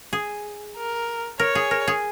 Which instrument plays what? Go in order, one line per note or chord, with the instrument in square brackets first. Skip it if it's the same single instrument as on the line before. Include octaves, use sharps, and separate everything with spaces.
[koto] G#4
[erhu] A#4
[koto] A#4 [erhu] C#5
[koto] G#4
A#4
G#4